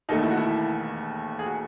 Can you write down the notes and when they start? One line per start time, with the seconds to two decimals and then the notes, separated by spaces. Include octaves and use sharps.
0.09 E1 D#2 D#3 A3 D#4
0.23 E4
0.31 F#4
0.37 E4
1.39 G#4
1.46 F#4